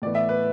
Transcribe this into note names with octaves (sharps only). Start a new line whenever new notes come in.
A2 E3 B3 D5
E5
B4